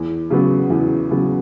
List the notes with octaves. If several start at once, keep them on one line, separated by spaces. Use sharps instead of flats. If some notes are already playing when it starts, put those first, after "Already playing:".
Already playing: E2
C#3 F#3 B3
E2
C#3 F#3 B3